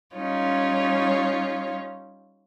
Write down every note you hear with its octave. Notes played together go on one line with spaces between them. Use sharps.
G3 C#4 D#4 F4 C#5